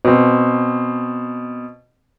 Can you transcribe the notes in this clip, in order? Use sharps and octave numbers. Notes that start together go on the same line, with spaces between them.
B2 C4